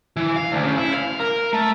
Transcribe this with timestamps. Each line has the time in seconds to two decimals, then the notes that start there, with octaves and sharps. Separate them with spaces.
0.17 E3
0.36 F5
0.52 D2
0.64 C#3
0.77 E4
0.94 F5
1.20 A#4
1.53 A3